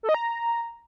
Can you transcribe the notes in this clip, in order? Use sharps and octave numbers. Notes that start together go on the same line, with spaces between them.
A4
D#5
A#5